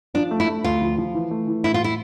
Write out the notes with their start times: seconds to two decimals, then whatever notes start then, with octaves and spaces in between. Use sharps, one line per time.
0.14 F3 D4
0.31 A3
0.40 E4
0.47 A3
0.64 D2 F4
0.82 F3
0.98 F3
1.14 E3
1.31 A3
1.47 E3
1.64 A2 E4
1.74 F4
1.84 E4